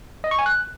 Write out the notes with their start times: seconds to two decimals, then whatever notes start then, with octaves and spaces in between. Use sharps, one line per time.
0.24 D#5
0.31 C#6
0.39 G#5
0.46 F#6